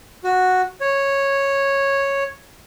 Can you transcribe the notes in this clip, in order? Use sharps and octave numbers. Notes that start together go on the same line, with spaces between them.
F#4
C#5